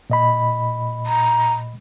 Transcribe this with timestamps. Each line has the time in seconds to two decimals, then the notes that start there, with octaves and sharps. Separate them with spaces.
0.10 A#2 D#5 B5
1.07 A#5